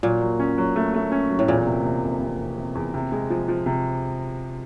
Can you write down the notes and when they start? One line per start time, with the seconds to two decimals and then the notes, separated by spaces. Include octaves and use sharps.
0.03 A#2 F#3
0.21 F#3
0.40 C#4
0.58 F#3
0.76 A3
0.94 A3
1.12 C#4
1.30 F#3
1.39 A2
1.48 E2 A#2
1.66 C3
1.85 C3
2.03 F1
2.21 C3
2.39 F1
2.57 C3
2.75 E2
2.94 C3
3.12 G#3
3.30 F3
3.48 F3
3.66 C3